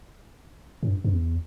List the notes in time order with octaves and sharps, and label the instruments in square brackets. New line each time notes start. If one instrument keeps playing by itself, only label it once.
[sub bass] A2
G2
G2
E2